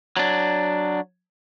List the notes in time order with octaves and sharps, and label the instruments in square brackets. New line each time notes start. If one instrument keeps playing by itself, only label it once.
[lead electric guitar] F#3 D4